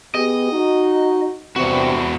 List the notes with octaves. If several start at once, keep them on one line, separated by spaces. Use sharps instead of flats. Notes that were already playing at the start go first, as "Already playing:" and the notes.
B3 G4 G#4 D#5
D#4 F#4
E2 G2 C3 C4 F#4